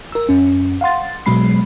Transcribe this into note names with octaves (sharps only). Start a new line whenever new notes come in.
A#4 E6
F#2 C#4
F5 F#5 C6 A6
B2 F#3 G#3 B5 C7